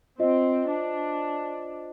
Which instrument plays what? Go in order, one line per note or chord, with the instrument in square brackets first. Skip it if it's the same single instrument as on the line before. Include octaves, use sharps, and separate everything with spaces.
[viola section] C4 [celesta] F4 C5 D#5
[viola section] D4